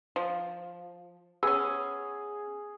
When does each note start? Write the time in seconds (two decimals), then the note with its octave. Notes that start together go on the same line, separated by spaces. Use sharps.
0.16 F3
1.43 B3 C#4 G#4 E6